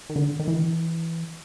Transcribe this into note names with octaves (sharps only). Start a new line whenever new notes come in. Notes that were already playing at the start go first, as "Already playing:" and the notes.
D#3
D3
D#3
E3